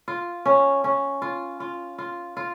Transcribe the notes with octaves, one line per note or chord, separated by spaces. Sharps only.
F4
C#4
C#4
F4
F4
F4
F4